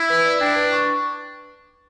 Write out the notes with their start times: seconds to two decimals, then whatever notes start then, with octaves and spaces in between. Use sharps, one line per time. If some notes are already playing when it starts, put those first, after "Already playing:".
Already playing: E4
0.10 B4
0.25 D5
0.41 D4 G5
0.56 B4
0.72 C#6